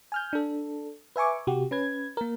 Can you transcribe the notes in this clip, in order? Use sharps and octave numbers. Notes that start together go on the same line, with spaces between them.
G#5 F6 G6
D4 A4
B4 E5 G#5 C#6 D6
C3 F#4 G4
C#4 B4 G#6
A#3 A#4